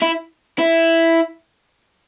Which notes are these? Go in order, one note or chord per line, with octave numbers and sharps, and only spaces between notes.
E4
E4